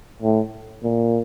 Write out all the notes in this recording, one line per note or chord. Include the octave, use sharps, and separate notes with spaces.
A2
A#2